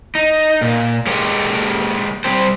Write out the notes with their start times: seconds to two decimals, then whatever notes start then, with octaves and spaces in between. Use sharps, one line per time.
0.15 D#4
0.62 A#2
1.07 G#3 A#3 G4 C#5
2.24 G3 C4 G4 C5